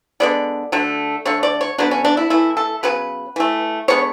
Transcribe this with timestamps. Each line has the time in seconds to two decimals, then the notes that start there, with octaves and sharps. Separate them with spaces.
0.20 D3 G#3 B3 D5
0.72 D3 F#3 A3
1.25 D3 A3 C#5
1.43 D5
1.61 C#5
1.78 D3 F#3 B3 D4
1.91 C#4
2.05 D4
2.17 E4
2.30 E3 A3 E4
2.57 A4
2.83 C#3 F#3 B3 B4
3.36 E3 A3
3.88 D3 G#3 B3 C#5